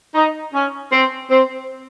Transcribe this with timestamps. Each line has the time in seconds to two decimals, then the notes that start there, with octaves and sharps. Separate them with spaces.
0.14 D#4
0.54 C#4
0.92 C4
1.31 C4